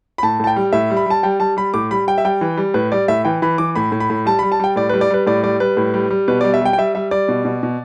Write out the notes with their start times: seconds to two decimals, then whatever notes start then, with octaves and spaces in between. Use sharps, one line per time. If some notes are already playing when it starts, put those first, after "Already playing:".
0.18 B5
0.23 A2 A5
0.40 A2 A5
0.47 G5
0.56 G3
0.73 A2 E5
0.90 G3
0.97 B5
1.06 G3 A5
1.23 G3 G5
1.40 G3 A5
1.57 G3 B5
1.74 A2 D6
1.91 G3 B5
2.07 G3 G5
2.18 E5
2.25 G3 G5
2.41 E3
2.57 G3
2.74 A2 B4
2.92 G3 D5
3.08 A2 E5
3.25 E3 G5
3.42 E3 B5
3.58 E3 D6
3.75 A2 B5
3.92 A2
4.00 B5
4.10 A2
4.26 G3 A5
4.39 B5
4.43 G3
4.52 A5
4.60 G3 G5
4.76 A2 D5
4.89 B4
4.94 G3
5.01 D5
5.10 G3 B4
5.27 A2 D5
5.43 G3 D5
5.60 G3 B4
5.77 A2
5.94 G3
6.10 G3
6.28 B2 B4
6.41 G3 D5
6.54 E5
6.61 G3 G5
6.73 G5
6.78 G3 E5
6.95 G3 E5
7.11 G3 D5
7.29 B2
7.45 B2
7.63 B2